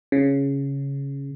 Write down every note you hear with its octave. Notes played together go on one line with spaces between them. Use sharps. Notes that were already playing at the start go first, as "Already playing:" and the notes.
C#3